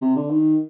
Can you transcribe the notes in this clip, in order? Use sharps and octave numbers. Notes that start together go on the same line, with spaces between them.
C3
D3
D#3